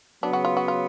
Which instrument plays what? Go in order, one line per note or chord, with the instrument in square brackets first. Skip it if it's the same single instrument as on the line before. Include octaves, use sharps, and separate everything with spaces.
[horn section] C#3 F#3 B3 [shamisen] D4
[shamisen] F#4
F4
F#4
F4